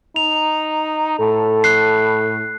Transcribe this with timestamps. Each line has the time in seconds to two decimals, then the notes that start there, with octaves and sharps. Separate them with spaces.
0.16 D#4 F7
1.20 A2 A4
1.64 F#6 C7